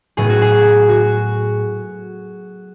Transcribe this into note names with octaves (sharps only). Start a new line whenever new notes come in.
A2 F#3 B3 G#4
F#4
G#4
F#4